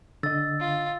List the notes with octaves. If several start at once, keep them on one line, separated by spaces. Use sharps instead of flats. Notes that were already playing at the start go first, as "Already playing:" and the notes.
D3 D#5 E6 A6
F4